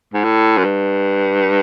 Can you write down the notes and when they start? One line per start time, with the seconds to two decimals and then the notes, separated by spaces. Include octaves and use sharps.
0.13 G#2
0.24 A2
0.57 F#2
0.64 G2